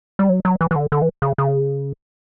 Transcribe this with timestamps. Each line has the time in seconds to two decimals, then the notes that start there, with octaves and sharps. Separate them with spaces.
0.19 G3
0.29 F#3
0.45 F#3
0.61 E3
0.71 E3
0.76 D3
0.92 D3
1.02 E3
1.22 C#3
1.38 C#3